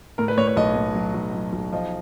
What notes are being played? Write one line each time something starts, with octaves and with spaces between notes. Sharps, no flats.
A2 A#4
B4
A2 C#5
C#5
B1 D#5
A2
F#3
B1
F#3
B1
F3 D#5